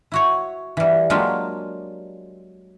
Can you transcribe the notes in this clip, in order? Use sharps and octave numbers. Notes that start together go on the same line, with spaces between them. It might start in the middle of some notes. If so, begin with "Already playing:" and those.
E4 F#4 C#5
E3 G3
F#3 G#3 A#3 D4 F4 G4